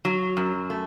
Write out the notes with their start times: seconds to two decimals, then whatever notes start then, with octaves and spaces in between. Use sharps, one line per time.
0.05 F#3
0.37 F#2
0.70 A3